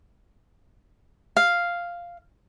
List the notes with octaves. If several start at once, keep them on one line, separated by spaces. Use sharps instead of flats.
F5